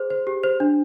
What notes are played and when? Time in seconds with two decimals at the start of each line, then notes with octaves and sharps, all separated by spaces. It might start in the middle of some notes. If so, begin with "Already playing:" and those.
Already playing: G#4 C5
0.10 C5
0.27 G4
0.43 C5
0.60 D4